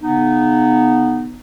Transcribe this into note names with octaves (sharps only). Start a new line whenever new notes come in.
C#3 B3 D#4